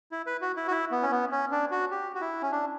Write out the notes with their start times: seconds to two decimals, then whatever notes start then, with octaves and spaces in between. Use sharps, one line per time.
0.12 E4
0.26 B4
0.41 F#4
0.57 E4
0.68 F#4
0.71 E4
0.91 B3
1.03 C#4
1.11 B3
1.32 C#4
1.51 D4
1.71 F#4
1.91 G4
2.15 F#4
2.21 E4
2.42 C#4
2.51 D4